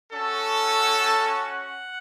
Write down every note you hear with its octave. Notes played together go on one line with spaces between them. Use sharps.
C#4 F#4 A4
F#5